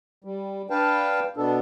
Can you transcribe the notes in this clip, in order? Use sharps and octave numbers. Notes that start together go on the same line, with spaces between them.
G3
D4 B4 F5 G5 A5
B2 B3 D4 A4